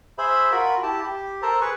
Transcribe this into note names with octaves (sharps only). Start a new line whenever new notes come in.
G#4 C5 E5 B5
F4 F#4 A#4 B5
E4 G4 A5
G4
A4 A#4 C5 A5 A#5
G#4 B4 C#6